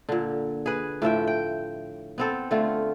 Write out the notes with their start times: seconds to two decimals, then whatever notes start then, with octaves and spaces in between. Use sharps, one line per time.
0.09 A#2 D3
0.66 G#4 B4
1.02 A2 F3 E5 G5
1.27 G5
2.18 B3 C4 A4
2.51 D3 A3 F4